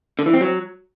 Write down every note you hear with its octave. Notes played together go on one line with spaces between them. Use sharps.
D3
E3
C4
F#3